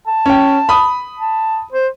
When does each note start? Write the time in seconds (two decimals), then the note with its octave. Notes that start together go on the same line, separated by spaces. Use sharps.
0.07 A5
0.26 C#4 G5
0.69 B5 D#6
1.20 A5
1.72 C5